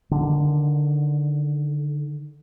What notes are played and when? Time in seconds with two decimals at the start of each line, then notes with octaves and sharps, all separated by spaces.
0.11 D3 D#3